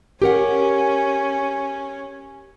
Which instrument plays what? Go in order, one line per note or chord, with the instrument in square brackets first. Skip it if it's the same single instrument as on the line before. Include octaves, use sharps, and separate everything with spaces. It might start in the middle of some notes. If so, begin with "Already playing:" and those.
[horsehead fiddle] C#4 [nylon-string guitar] G4 A#4 F#5